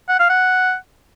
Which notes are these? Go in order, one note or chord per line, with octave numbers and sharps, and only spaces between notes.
F#5
F5
F#5